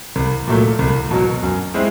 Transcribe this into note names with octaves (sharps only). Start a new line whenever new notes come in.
C2
A#2 F#3 A3
C2
B2 F#3
F#2
G#3 C4 E4